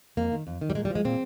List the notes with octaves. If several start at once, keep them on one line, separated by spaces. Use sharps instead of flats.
F2 A#3
D#3
F2
D#3
G3
A#2 G#3
G3
F3
G#3
A#2 C4